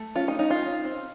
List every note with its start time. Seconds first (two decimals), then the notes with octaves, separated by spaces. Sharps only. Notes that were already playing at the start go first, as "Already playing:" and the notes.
Already playing: A3
0.16 C#4 F4
0.28 D#4
0.39 C#4 D#4
0.50 F4
0.62 D#4
0.85 C4